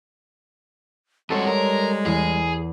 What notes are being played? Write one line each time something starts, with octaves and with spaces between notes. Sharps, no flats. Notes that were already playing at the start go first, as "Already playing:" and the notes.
F2 G3 G#3 F#4 A4 C5 C#5
A#4
E2 G#4